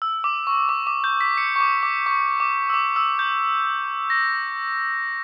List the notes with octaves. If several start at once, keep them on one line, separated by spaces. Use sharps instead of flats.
E6
D6
C#6
D6
D6
G6
B6
C#7
C#6
D6
D6
C#6
D6
E6
D6
E6
G6
A#6